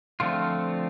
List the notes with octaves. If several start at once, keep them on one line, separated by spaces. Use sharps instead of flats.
D3 F3 A3 C4 F4